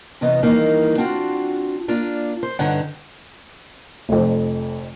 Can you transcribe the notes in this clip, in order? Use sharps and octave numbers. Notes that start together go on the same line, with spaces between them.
F#2 C3 E3 B3 D#5
D#3 E3 G3 A#3 D#4
C4 D4 F4 F#4 F#5
A#3 D4 F4 D5
C5
G2 D3 D#4 C#5 F#5
F1 F2